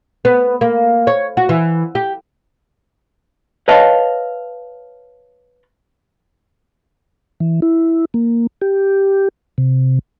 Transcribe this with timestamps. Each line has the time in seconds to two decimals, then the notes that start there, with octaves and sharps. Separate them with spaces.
0.25 B3
0.61 A#3
1.07 C#5
1.37 F#4
1.49 E3
1.95 G4
3.68 B4 C#5 D#5 F5 A5
7.40 E3
7.62 E4
8.14 A#3
8.61 G4
9.58 C3